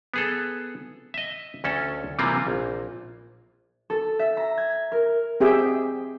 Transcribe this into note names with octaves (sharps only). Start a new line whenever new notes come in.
B3 G#4 A4
D#5 E5
D2 C#4 A4
C3 E3 G3 A#3 C4 F4
A#1
A4
E5
A#5
G#6
A#4
C4 G4 G#4 E5 G5